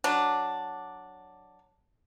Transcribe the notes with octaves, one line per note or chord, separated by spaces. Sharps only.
F#3 D4